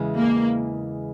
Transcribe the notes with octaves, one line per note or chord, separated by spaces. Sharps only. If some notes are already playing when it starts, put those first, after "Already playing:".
Already playing: E2 C#3 E3 G#3
A#3